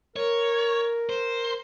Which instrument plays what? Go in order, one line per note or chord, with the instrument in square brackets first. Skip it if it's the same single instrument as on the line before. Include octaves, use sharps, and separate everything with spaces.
[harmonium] A#4 [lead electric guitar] C#5
[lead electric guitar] C5